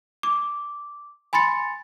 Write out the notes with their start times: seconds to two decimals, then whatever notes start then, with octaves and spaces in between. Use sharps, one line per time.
0.23 D6
1.33 G#5 B5 C6 A6 C#7